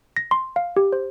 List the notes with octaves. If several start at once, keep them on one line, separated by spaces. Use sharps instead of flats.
A#6
C6
F5
G4
C5